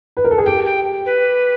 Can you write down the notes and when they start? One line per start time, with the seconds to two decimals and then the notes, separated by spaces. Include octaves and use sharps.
0.17 B4
0.24 A#4
0.31 A4
0.38 G#4
0.46 G4 G5
0.66 G5
1.06 B4